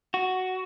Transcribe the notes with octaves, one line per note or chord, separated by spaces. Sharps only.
F#4